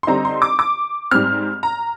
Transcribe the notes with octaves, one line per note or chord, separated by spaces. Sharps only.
C6
D3 G3 C4 D#4 A#5
C6
D6
D6
G#2 G3 C4 F6
A#5